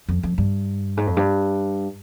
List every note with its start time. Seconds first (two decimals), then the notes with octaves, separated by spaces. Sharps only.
0.09 F2
0.23 F2
0.38 G2
0.97 G#2
1.07 F2
1.17 G2